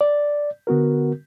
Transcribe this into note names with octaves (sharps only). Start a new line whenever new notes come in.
D5
D3 B3 F#4 A#4